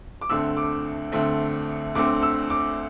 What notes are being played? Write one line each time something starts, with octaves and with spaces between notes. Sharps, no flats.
D6
D2 D3 A3 C4 E6
D6
D2 D3 A3 C4
D2 D3 A3 C4 D6
E6
D6